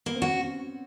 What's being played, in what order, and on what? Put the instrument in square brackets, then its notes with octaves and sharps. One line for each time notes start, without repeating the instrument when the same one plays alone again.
[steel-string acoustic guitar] A#3 [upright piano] B3
[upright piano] C4
[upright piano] C#4 [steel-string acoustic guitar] F#4